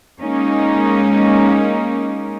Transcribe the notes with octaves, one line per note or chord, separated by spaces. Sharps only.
G#3 A#3 C#4 D#4